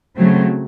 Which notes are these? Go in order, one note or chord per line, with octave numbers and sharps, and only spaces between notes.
C#3 F#3 A3 C4